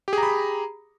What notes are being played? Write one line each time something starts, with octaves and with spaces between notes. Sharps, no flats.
G4 G#4 A#5 B5